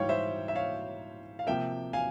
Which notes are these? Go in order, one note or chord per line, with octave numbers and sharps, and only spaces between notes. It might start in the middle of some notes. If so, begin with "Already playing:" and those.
Already playing: G#2 E3 G3 C#5 F5 G5
C5 E5
E5
C#5 F5
F5
C3 F3 A#3 E5 G5
F5 G#5